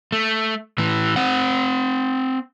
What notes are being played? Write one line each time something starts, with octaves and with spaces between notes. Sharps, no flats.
A3
A2 E3
C4 F#5